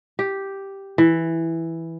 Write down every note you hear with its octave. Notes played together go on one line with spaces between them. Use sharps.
G4
E3